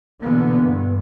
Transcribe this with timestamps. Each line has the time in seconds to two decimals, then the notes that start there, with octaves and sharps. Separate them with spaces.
0.22 B2 D3 E3 A#3 B3
0.60 G2